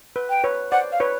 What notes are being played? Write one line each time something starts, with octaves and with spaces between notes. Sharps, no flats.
B4
G5
B4 C#5
C5 D5 F#5
F5
B4 C#5